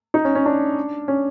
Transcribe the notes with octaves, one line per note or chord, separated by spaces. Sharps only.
D#4
C#4
C#4
D4
C#4